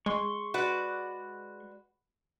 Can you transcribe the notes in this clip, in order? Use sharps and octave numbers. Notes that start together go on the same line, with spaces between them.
G#3 C6 C#6
F#4 B4 D5